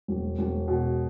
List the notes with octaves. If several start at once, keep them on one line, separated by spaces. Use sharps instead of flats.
E1
E1
B2